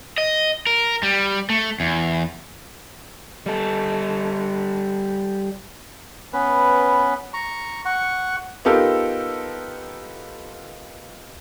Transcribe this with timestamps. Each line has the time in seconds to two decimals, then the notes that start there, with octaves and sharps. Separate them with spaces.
0.18 D#5
0.67 A#4
1.03 G3
1.50 A3
1.80 E2
3.46 G3 A4
6.33 B3 C#4 B4
7.34 A#5 C#6
7.85 F#5 C#6
8.65 B3 D#4 F4 G4 A4 A#4